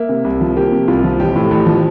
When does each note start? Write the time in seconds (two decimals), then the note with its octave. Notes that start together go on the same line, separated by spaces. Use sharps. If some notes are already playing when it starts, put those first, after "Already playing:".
Already playing: A#3 E5
0.09 C3
0.24 C2
0.41 F3
0.56 A#3 G4
0.72 C3
0.88 C2 F4
1.04 F3
1.19 A1 G4
1.36 A2
1.51 A1
1.66 F3